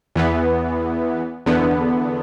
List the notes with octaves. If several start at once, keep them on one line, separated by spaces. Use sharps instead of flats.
E2 E3 B3
E2 D3 B3